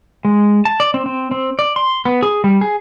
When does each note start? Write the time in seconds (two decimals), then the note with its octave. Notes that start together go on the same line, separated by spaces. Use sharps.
0.25 G#3
0.65 A5
0.80 D5
0.94 C4
1.06 C4
1.31 C4
1.59 D5
1.76 C6
2.05 B3
2.23 G#4
2.44 G3
2.61 G#4